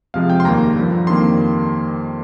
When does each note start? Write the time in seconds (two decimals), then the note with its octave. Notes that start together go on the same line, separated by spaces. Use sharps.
0.14 F2 C3 F3 G#3 F5
0.30 G5
0.40 C6
0.45 D#2 D#3 G3 A#3 A#5
0.76 G2 D3 F3
1.07 F2 D#3 G3 A#3 C6